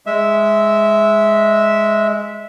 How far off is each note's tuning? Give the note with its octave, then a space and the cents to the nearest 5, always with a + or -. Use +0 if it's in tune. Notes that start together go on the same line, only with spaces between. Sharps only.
G#3 +0 E5 -10